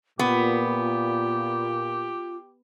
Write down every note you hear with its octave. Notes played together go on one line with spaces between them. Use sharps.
A#2 B3 F4 G4